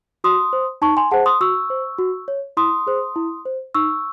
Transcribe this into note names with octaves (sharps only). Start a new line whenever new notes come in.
F#4 C6 D#6
C5
D#4 A5 C#6
G#5 C6
G#4 C5 F#5 A5
C6 D#6
F#4 C#6 E6
C5
F#4
C#5
E4 C6 D#6
G#4 C5
E4
C5
D#4 C#6 E6